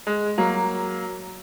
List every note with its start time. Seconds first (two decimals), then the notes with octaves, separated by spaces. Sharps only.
0.07 G#3
0.38 F#3 A#3